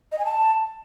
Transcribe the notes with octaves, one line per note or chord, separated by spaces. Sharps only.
D#5
G#5
A5